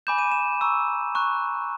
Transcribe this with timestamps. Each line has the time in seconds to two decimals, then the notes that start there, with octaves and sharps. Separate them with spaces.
0.07 G#5 B5 D6 G6 E7
0.18 D#7
0.32 E7
0.61 A#5 C#6 E6
1.15 A#5 C#6 F#6